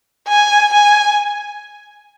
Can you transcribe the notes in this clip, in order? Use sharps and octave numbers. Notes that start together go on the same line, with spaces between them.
G#5
G#5